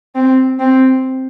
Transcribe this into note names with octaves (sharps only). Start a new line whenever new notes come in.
C4
C4